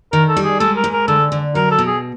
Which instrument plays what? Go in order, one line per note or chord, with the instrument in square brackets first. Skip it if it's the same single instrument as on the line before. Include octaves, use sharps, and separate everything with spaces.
[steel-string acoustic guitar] D#3 [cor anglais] A#4
[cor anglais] A4
[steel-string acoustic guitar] G3
[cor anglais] G#4
[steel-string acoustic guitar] G#3 [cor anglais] A4
[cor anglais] A#4
[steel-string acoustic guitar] G#2
[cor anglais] A#4
[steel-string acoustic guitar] D3 [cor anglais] A4
[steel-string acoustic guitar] D3
[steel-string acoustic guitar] F#3 [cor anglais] A#4
[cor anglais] A4
[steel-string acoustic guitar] B2
[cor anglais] G#4